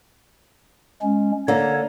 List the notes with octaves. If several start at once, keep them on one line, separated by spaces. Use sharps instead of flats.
G#3 C#4
D3 A#3 C#5